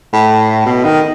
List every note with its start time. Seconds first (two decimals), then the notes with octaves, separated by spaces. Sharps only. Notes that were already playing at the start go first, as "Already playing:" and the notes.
0.13 A2
0.66 B2
0.84 D#3